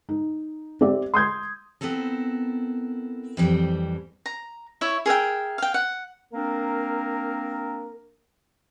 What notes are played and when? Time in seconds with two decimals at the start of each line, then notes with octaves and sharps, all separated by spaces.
0.09 D#4
0.81 C4 G4 D5 E5
1.14 C6 D#6 G6 G#6
1.81 B3 C4 E4 A4 A#4
3.37 F2 E3 G3 C4
4.26 A#5
4.81 E4 C#5 E5
5.06 G#4 A#4 E5 G5
5.58 F5 G5
5.74 F#5
6.34 A#3 C4 D4 A#4